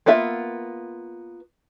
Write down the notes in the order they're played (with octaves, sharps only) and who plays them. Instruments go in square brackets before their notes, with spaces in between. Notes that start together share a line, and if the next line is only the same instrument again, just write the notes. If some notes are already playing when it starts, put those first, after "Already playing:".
[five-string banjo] A#3 B3 F4 E5